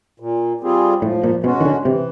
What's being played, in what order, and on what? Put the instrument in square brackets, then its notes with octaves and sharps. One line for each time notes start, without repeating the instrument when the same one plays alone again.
[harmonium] A#2
G3 C4 F4 G#4
[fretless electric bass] A2 [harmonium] F3
[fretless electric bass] A#2
[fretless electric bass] B2 [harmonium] G#3 C#4 F#4
[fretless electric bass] D#3
D3
[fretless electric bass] C3 [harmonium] E3